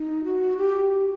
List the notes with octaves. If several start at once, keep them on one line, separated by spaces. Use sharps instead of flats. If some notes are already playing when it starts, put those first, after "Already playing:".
Already playing: D#4
F#4
G4